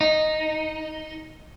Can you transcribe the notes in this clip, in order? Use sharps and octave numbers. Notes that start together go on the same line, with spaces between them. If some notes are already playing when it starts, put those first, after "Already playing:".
D#4